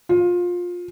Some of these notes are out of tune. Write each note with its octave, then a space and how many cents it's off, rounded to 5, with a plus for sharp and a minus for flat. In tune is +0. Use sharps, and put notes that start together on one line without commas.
F4 +20